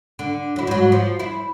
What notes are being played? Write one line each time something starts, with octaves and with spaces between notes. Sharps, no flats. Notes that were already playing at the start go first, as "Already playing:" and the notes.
D3
F#3 E4
G#2 F#3
F3
E4